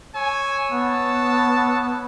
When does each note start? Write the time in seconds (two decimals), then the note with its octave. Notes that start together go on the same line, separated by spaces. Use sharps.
0.15 C#5 G#5 E6
0.72 B3 A5